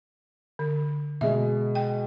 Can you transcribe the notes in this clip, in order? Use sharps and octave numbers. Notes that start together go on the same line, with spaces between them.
D3
B2 G#3 E5
G5